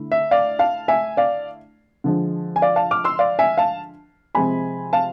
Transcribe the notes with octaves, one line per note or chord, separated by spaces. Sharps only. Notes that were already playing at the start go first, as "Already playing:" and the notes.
Already playing: D3 A3 E4
E5
D5 F5
F5 A5
E5 G#5
D5 F5
D3 F3 G#3
G#5
D5 F5
F5 A5
D6 F6
C6 E6
D5 F5
E5 G#5
F5 A5
C3 F3 G#3 C4 G#5 B5
F5 A5